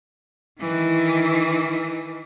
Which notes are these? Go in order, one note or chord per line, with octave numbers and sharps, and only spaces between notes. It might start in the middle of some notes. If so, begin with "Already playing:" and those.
D#3 E3